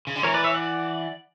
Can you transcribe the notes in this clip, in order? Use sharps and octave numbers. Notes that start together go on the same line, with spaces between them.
C#3
D3
E3 A#4 C#5
B4 D5
C#5 E5
D5 F#5